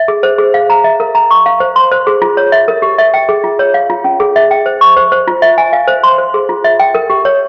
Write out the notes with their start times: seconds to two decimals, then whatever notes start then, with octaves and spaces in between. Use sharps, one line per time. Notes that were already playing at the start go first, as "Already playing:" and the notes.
Already playing: E5
0.08 G#4
0.23 C5
0.38 G#4
0.54 F5
0.70 A#5
0.84 E5
1.00 A#4
1.15 A#5
1.31 C#6
1.46 F5
1.60 C5
1.76 C6
1.92 C5
2.07 G#4
2.22 F4
2.37 C#5
2.52 E5
2.68 A#4
2.82 G4
2.98 E5
3.14 G5
3.29 G#4
3.44 F4
3.59 C#5
3.74 F5
3.90 F4
4.04 C#4
4.20 G#4
4.36 E5
4.51 G5
4.66 C5
4.81 C#6
4.97 C5
5.12 C5
5.28 F4
5.42 E5
5.58 G#5
5.73 F5
5.88 C5
6.03 C6
6.18 C5
6.34 G#4
6.49 F4
6.64 E5
6.79 G5
6.95 A#4
7.10 G4
7.25 C#5